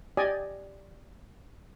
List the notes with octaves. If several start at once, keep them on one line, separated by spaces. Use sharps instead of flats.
G4 D5 D#5 G#5